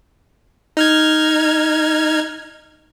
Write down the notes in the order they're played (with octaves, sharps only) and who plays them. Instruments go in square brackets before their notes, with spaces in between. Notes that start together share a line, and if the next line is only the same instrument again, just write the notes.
[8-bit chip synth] D#4 F6 G#6